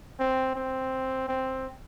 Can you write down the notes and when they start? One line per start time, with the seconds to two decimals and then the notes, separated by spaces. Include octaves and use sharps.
0.20 C4
0.56 C4
1.29 C4